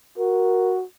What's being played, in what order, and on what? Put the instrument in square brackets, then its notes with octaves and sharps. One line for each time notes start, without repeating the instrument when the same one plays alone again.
[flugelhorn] F#4 [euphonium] A#4